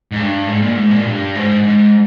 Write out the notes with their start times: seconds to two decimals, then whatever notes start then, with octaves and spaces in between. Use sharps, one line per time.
0.12 G#2
0.20 G2
0.48 G#2
0.62 A#2
0.77 G#2
0.91 A#2
1.05 G2
1.35 G#2
1.63 G#2